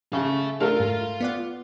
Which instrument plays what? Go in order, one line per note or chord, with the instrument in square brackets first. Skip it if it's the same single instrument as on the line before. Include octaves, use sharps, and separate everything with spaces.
[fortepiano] C#3 [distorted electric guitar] A4 E5
[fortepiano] A3 A#4 [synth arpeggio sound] D4 [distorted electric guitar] F4 F5
[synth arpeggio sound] G#2
B3 D5 F#5